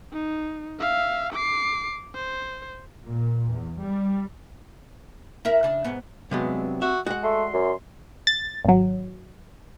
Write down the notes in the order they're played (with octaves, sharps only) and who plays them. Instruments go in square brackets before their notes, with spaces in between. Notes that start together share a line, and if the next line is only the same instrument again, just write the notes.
[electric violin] D#4
E5 F5
D6 C7
C5
[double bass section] A#2
E2
G3
[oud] E4 A#4 E5
C#3 D4
G#2 B3
[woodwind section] G2 C4 [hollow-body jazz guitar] C3 F#3 B3 [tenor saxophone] G#3
[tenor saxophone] F#4 [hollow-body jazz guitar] E5
[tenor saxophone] G#3 [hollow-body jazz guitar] F#4 F#5
[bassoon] A3 [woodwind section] D5 E5 C6
[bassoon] F#2
[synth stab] A6
G#1 F#3